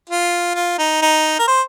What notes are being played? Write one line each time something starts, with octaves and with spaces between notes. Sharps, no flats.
F4
F4
D#4
D#4
A#4
C5